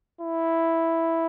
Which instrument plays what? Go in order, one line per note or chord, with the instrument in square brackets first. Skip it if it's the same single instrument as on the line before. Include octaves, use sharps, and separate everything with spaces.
[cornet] E4